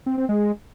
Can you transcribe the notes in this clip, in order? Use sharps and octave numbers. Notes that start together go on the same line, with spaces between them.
C4
C4
G#3